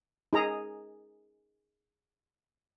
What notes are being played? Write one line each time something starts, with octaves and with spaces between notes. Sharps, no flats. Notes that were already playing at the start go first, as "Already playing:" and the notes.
D#4 G#4 A#5